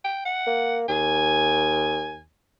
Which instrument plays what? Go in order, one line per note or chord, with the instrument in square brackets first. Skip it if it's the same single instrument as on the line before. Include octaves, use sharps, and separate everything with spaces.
[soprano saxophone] G5
F#5
[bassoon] A#3
[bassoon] D#2 [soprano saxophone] G#5